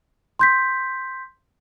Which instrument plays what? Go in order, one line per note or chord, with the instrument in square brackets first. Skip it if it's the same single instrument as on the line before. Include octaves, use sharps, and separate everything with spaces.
[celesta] C6 G6 B6